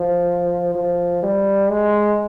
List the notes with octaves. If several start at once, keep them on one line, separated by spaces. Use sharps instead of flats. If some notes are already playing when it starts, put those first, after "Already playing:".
Already playing: F3
F3
G3
G#3